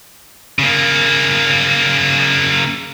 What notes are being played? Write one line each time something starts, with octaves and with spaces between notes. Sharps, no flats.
C#3 A#3